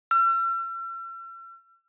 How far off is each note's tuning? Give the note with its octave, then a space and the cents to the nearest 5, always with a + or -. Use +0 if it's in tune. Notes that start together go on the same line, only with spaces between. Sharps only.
E6 +45